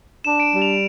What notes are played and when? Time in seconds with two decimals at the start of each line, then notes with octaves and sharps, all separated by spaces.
0.24 D4 E7
0.40 D7
0.43 E7
0.52 G3
0.62 F7